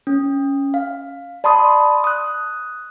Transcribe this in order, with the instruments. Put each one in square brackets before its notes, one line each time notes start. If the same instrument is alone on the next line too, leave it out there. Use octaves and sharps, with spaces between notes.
[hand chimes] C#4
F5
D5 A5 B5 C6 D#6
D#6 F#6